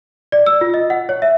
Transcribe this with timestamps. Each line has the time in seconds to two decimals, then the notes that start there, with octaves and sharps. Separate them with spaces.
0.32 D5
0.47 E6
0.61 F4
0.74 D#5
0.90 F#5
1.09 C#5
1.22 E5